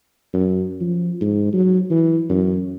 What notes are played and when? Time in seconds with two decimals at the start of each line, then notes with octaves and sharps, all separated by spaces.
0.34 F#2
0.81 F3
1.21 G#2
1.53 F#3
1.90 E3
2.30 F#2